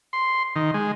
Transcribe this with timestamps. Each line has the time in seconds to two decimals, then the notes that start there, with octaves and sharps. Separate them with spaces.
0.13 C6
0.56 D#3
0.74 G#3